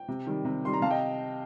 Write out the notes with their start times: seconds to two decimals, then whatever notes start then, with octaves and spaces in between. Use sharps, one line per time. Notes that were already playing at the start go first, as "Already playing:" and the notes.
Already playing: G5
0.08 C3
0.26 D#3 G3
0.45 C3
0.63 D#3 G3 C6
0.73 A#5
0.82 C3 F5 A5
0.90 D#5 G5